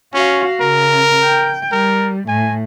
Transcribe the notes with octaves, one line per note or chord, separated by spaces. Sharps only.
C#4 F#4 F5
C#3 A#4
G5
G3 A#4
A2 G#5